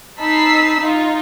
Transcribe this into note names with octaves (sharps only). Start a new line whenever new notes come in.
D#4 A5 B5 E6 B6 C7
D#4 F4